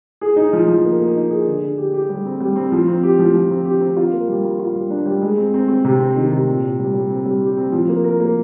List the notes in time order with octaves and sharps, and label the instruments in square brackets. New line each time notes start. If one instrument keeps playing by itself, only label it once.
[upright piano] G#4
D#4
F3
F3
A#3
A#3
D#4
G#4
D3
D3
G4
G4
G3
C4
G3
C4
F3
C4
G4
F3
F3
C4
G4
C4
F4
A#3
G3
F4
F4
G3
D4
G3
G#3
C4
C4
C4
C3
C4
D#3
C3
A#2
A#2
G3
G3
C4
G3
G4
C4
F3
A#3
A#4
A#3